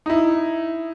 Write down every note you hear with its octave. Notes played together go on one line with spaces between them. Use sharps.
D#4 E4